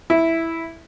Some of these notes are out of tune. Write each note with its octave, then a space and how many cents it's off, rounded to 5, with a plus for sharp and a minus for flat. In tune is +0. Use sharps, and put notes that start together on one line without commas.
E4 -5